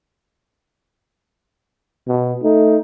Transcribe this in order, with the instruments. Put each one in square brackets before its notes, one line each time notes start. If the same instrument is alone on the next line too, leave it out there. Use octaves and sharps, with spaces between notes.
[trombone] B2
[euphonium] A3 [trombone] D#4